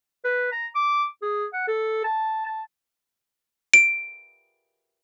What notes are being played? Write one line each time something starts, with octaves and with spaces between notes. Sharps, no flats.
B4
A#5
D6
G#4
F#5
A4
A5
A5
D7